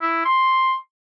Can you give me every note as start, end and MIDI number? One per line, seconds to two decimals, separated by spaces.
0.01 0.22 64
0.25 0.75 84